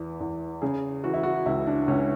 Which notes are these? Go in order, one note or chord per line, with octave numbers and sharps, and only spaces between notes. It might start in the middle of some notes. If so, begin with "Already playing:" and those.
Already playing: E2 E3
E2
C#3 G#4
E3 F#4
E4
F#4
C#2 E4
D4
C#2 C#4